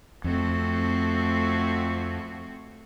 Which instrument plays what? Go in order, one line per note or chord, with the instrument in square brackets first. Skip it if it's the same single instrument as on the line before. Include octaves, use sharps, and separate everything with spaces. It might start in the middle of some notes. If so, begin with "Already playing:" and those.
[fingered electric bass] F2 [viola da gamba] A3 C4 F#4